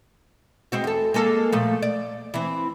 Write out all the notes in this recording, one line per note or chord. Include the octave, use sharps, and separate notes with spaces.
G#3 C4 F#4
E2 A4
G#3 A#3 A4
A#2 F3 A3
D5
E3 C4